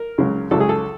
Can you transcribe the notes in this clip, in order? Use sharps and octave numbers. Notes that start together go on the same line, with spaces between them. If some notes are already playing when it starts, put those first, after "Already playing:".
Already playing: A#4
C#2 C#3 F#3
C#2 C#3 F#3 A4
G#4
A4